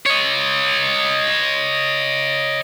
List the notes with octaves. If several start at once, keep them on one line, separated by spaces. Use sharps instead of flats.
C#5 D#5